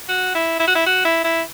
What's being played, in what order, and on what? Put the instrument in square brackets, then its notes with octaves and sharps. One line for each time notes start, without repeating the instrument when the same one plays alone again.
[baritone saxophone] F#4
E4
E4
F#4
E4
F#4
E4
E4